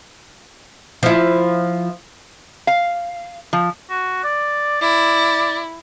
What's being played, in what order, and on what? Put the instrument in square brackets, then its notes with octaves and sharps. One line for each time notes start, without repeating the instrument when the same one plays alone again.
[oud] F3 E4
[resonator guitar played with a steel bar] F5
F3
[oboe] F#4
D5
[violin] E4 [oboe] D5